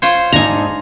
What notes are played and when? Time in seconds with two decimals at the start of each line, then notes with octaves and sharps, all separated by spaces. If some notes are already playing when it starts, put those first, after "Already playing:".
0.02 F4 C5 C#5
0.32 G#2 D4 D#4 G#5 A#5